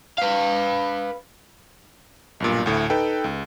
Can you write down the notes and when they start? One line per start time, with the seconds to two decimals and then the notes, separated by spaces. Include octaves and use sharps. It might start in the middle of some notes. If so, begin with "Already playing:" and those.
0.18 B4 F5
2.40 B1 G2 A#2
2.66 D2 A2
2.90 D#4 A4 B4 G5
3.24 C#2